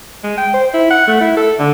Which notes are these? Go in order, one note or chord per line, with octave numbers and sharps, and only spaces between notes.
G#3
G5
C5
E4
F#5
A3
E4
A4
D3